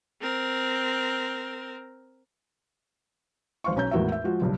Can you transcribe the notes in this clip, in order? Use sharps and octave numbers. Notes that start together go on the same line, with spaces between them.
C4 A#4
G#1 C5 F5 C6 C#6
B1 C#4 A#5 G6
G#1 E2 A2 F#4 A#4 E5
E5
F3 G#3 F4 F#4
F#1 B1 G2